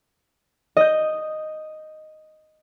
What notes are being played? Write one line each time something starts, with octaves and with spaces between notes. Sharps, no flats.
D#5 G6